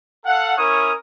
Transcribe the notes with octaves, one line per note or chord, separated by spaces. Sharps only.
A4 F5 F#5
C#4 E4 A#4 C#5 D#6